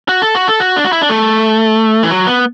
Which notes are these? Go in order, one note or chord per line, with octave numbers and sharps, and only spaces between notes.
F#4
A4
F#4
A4
F#4
D4
F#4
E4
D4
A3
E3
F#3
B3